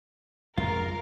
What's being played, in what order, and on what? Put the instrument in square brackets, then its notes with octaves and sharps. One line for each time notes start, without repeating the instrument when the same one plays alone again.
[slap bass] F2 G3 G#3 [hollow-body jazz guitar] F4 [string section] A#4